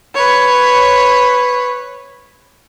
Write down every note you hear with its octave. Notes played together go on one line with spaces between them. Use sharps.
B4 C#5